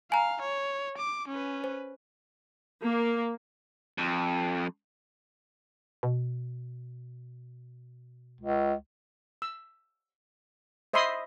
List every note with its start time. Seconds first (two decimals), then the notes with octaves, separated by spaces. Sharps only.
0.12 F5 G#5 A#5
0.41 C#5
0.98 D6
1.28 C#4 B4
1.64 C5
2.83 A#3
3.98 F2
6.03 B2
8.41 C#2
9.42 E6
10.93 C5 D#5 E5 B5 C6 D#6